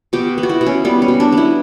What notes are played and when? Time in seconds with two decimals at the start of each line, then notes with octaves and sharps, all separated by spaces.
0.13 B2 G4
0.38 B3
0.43 F#4
0.49 E4
0.61 B2
0.66 C#4
0.85 G3 B3
1.02 C#4
1.08 B2
1.20 D4
1.32 B3 E4